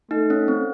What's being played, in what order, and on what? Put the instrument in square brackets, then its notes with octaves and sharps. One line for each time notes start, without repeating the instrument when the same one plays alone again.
[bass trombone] A3 [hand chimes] D#4
[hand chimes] C#4
C4